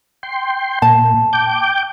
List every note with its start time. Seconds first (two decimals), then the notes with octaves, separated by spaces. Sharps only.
0.23 G5 C6
0.82 A#2 A5
1.33 G5 D6 G6